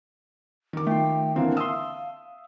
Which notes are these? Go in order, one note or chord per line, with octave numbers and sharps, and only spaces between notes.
D#3 D6
A3 F4 G5
D3 E3 A#3 C4 F5
E5 A5 C6 D#6 E6